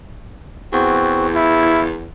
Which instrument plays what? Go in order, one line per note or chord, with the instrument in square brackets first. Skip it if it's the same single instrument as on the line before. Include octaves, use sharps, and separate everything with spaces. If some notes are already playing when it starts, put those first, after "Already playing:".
[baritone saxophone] E2 [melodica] C4 F#4
[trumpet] E4 [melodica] F5